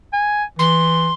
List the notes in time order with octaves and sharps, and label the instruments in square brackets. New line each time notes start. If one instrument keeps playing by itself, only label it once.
[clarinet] G#5
[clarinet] E3 [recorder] C6